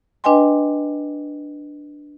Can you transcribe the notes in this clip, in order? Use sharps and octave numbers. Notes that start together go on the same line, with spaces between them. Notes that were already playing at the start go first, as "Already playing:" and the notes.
D4 B4 D#5 G5 G#5 C6